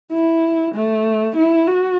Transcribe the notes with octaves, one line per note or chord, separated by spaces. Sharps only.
E4
A3
E4
F#4